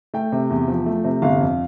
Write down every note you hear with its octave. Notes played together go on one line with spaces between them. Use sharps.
A3 G5
C3
E2
F3
A3
C3
G1 F5
F2